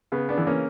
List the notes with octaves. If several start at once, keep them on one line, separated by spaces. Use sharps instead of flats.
C#3 B3
B3 D4
E3
A#3 C#4